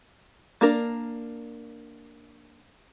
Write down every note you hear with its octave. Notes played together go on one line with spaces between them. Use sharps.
A#3 D4 A#4